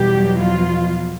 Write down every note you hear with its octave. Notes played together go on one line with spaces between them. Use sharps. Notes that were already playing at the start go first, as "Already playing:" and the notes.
Already playing: E2 B2 F#3 G3 G4
F3 F4